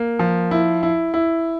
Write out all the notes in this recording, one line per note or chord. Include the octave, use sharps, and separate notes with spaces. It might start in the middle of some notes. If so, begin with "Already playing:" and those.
Already playing: A#3
F3
E4
E4
E4